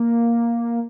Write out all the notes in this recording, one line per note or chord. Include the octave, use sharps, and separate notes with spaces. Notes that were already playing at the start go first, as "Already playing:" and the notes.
Already playing: A#3